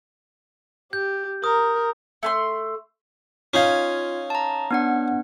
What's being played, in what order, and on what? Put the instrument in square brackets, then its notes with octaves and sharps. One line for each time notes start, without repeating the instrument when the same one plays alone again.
[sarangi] G4 [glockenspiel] G6
[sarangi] A#4 [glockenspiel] D#6
[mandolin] A3 A5 C6
[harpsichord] C#4 D#4 F5 [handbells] F4 G#6
[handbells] A5 A#5
B3 D4 F#5